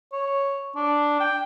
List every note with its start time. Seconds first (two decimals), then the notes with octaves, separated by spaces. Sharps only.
0.13 C#5
0.76 D4
1.20 G5